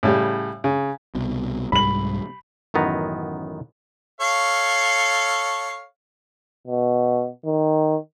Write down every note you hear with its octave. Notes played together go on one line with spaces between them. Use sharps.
A2 C#3 G3
C#3
C2 B2
C2 G#2 G3 B5 F#7
A1 F#2 D#3 B3 A#5
A4 C#5 F5
B2
D#3